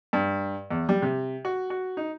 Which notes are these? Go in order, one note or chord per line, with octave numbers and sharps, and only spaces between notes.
G2
E2
G3
C3
F#4
F#4
D#4